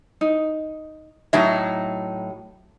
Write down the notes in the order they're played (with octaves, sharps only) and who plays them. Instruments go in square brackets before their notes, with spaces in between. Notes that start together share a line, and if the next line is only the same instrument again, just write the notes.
[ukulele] D#4
[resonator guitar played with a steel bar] A2 F#3 D#4 [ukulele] E5